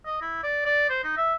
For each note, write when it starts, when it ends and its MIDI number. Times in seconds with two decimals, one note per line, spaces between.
0.06 0.20 75
0.22 0.40 64
0.43 0.63 74
0.66 0.89 74
0.90 1.00 72
1.04 1.15 63
1.17 1.35 76